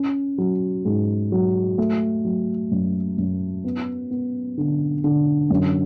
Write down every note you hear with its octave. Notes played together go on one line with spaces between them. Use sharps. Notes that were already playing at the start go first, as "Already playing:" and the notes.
Already playing: C#4
F#3
G#2
F#3
A3
F#3
F#2
F#2
B3
B3
D3
D3
F#2